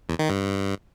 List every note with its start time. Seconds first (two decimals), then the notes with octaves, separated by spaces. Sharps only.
0.09 E2
0.19 D#3
0.29 G2